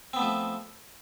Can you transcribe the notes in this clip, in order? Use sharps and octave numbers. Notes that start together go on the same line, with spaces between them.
F3 A3 B3 C4